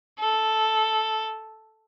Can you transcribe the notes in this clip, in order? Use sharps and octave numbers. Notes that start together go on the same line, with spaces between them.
A4